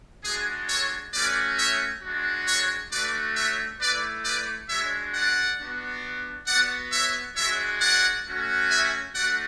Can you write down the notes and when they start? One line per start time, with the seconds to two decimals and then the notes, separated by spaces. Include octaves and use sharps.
0.24 G#3 D4 F#4 G#4
0.68 A4 C#5
1.13 A3 C#4 F#4 B4 D5
1.58 C#5 E5
2.02 G#3 D4 F#4
2.47 A4 C#5
2.91 A3 D4 F#4 B4 D5
3.35 C#5 E5
3.80 A3 E4 B4 D5
4.24 B4 D5
4.69 G#3 D4 F#4 C#5 E5
5.14 D5 F#5
5.58 B3 D4 F#4
6.47 B3 F#4 D5 F#5
6.92 C#5 E5
7.36 G#3 D4 F#4 C#5 E5
7.81 D5 F#5
8.25 A3 C#4 F#4
8.70 E5 G#5
9.14 A3 D4 F#4 D5 F#5